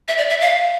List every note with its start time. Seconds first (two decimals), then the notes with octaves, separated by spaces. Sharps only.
0.08 E5
0.18 D5
0.29 E5
0.41 F5